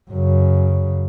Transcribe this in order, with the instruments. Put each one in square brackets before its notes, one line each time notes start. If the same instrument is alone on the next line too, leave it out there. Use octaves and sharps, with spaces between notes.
[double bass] F#2 C#3